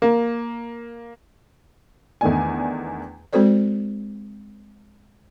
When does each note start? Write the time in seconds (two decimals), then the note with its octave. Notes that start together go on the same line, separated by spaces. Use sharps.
0.02 A#3
2.21 E2 D#3 A3 D4 G#5
3.33 G#3 C4 F#4 A4 C5 D5